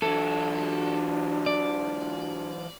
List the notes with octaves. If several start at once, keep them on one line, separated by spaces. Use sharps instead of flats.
E3 F#3 D4 A4
D5